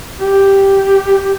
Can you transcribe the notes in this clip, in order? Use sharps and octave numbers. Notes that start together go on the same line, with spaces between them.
G4